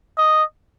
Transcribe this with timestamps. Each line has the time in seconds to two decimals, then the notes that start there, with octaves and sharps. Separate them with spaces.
0.18 D#5